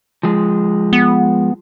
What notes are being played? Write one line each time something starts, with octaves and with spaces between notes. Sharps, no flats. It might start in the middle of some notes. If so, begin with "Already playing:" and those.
F3 G#3
B3